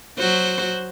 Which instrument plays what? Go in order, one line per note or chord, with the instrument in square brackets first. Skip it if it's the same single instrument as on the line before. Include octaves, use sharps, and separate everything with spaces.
[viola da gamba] F#3 F#4 C5